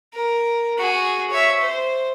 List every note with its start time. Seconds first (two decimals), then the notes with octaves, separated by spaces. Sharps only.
0.14 A#4
0.78 F#4 G#4
1.30 C#5 E5
1.61 C5